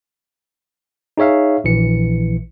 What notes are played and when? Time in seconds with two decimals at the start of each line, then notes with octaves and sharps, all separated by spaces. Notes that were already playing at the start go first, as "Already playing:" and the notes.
1.17 D#4 G#4 C#5 E5 F5
1.64 A#1 E3 C#7